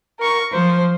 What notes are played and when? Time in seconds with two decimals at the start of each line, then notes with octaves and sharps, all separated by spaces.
0.20 A#4 C#6
0.52 F3 C5